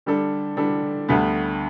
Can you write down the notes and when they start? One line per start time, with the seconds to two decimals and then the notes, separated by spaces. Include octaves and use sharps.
0.06 D3 G3 D4 A4
0.57 D3 G3 D4 A4
1.08 D2 D3 G3 B3